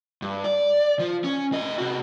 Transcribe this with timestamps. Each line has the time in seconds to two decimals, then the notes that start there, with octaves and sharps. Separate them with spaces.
0.22 G2
0.44 D5
0.99 F3
1.24 C#4
1.52 A2 D#5
1.78 C3 F#4